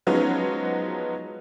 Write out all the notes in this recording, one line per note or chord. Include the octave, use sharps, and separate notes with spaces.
F3 F#3 G#3 B3 C#4 D#4